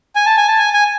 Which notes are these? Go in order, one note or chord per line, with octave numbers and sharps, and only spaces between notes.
G#5
A5
G#5
A5
G#5
G#5